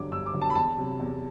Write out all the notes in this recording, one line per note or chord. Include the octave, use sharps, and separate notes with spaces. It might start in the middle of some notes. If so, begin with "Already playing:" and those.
Already playing: G2 D3 F#3 D6
G2 E6
D6
D3 F#3
A5
B5
E2 A5
C3 F#3
E2